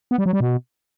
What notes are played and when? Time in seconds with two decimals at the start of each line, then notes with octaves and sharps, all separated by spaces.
0.11 B3
0.18 G3
0.26 F#3
0.33 G3
0.40 B2